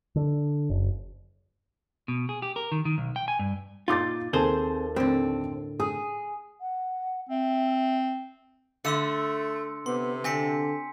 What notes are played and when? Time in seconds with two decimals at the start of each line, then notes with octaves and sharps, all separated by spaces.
0.16 D3
0.70 F#1
2.08 B2
2.29 G#4
2.42 G4
2.56 A#4
2.72 D#3
2.85 D#3
2.98 B1
3.16 G5
3.28 G#5
3.39 G2
3.88 A#2 D#4 F4 C6 D6 A6
4.33 D#2 C4 G#4 A4 C5 A5
4.96 A2 D3 C4
5.80 G#4 D#6
6.60 F#5
7.29 C4 E5
8.85 D3 A3 E5 C6 E6 C#7
9.86 C3 B3 C6
10.24 D3 C4 G#5 B6 C#7